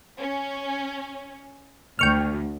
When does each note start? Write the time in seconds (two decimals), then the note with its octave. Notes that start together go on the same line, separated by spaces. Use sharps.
0.18 C#4
1.99 D2 G5 C#6 F6